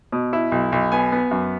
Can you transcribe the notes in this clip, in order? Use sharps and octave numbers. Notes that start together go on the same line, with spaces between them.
B2
E4
B1
B1
B3 G#5
B3
F#2